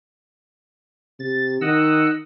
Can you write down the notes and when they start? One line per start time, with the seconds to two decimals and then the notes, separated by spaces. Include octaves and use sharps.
1.19 C3 A6
1.61 D#3 D#5 F#5 E6